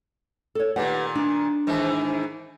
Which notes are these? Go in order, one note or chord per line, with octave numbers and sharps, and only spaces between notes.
A4 C#5
A#2 D#3 G4 B4 F#5
D4 D#4
G#2 D#3 E3